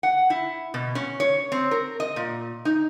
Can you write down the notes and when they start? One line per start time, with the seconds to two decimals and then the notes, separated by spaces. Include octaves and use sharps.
0.03 F#5
0.30 E4
0.74 B2
0.95 C#4
1.20 C#5
1.52 C4
1.71 A#4
2.00 D#5
2.16 A#2
2.65 D#4